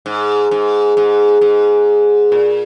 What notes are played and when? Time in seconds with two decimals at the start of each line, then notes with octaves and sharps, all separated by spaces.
0.06 G#2
0.51 G#2
0.97 G#2
1.41 G#2
2.32 A#2